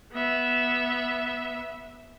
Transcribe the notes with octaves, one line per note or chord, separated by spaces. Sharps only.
B3 E5